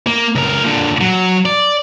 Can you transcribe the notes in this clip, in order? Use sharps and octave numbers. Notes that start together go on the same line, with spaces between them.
A#3
C#2 A#4
A#2 D3
F#3
D5